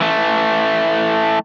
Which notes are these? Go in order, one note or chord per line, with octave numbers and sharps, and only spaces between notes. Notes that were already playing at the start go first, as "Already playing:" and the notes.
E3 A3